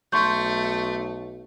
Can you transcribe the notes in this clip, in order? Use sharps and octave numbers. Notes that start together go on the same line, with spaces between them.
B1 A3 C6 C#6 G6